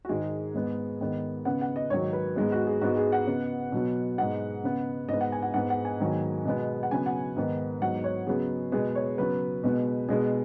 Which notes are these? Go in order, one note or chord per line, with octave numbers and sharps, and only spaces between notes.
F#4
G#2 D#3 G#3 G#4
G#2 G#3 B3
G#2 D#3 B3
C#3 B3 F#5
F#5
D#5
G#2 D#3 F#3 C#5
B4
G#2 G#3 B3 G#4
F#4
G#4
G#2 G#3 B3 F#4
G#4
F#5
C#3 B3
B2 F#3 B3
G#2 G#3 B3 F#5
C#3 B3
G#2 G#3 B3 D#5
F#5
G#5
F#5
G#2 G#3 B3 F#5
F#5
G#5
G#2 D#3 F#3 B3
B2 G#3 B3
F#5
C#3 F#3 B3 G#5
F#5
G#2 D#3 B3
G#2 F#3 B3 F#5
C#5
C#3 F#3 B3 G#4
B2 G#3 B3 G#4
C#5
C#3 F#3 B3 B4
B2 G#3 B3
B2 G#3 B3 G#4